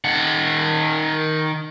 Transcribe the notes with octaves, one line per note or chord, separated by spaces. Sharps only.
D#3 F#5